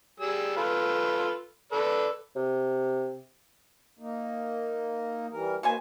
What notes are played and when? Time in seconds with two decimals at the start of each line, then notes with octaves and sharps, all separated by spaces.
0.20 G3 G#4 E6
0.56 F4 A4 B4
1.72 A4 B4 D5
2.36 C3
3.99 A#3 D#4
5.31 E3 G3 A#4
5.63 B2 A#3 D#4 F#4 C5 G#5